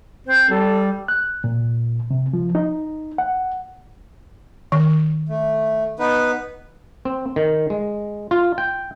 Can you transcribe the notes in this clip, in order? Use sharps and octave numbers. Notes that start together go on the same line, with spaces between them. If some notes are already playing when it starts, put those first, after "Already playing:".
C4 C5
G3 A4
F#6
A#2
C3
F3
D#4
F#5
D#3
A3
B3 D#4 B4
C4
D#3
G#3
F4
G5